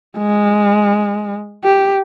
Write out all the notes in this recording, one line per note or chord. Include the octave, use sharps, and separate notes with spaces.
G#3
G4